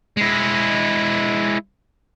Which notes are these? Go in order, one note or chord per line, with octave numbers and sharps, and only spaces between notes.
G#3 E4